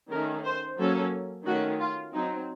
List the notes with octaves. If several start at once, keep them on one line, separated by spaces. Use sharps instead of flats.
D#3 A3 C#4 A#4
C5
F#3 A#3 C#4 A4
D#3 A3 C#4 F#4
F4
F#3 C4 D#4